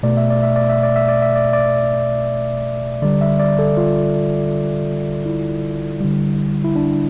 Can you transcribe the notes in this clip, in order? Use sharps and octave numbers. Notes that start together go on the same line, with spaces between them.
B2 A3 D5
E5
D5
E5
D5
E5
D5
E5
D5
E5
D5
D5
D3 G3 D5
E5
D5
A4
F4
E4
D3 G3
E4
D4